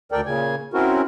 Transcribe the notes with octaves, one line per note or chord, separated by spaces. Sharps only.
D2 A4 A#4 D5 G5
A#2 C#3 G#5
C4 C#4 E4 F#4 A#4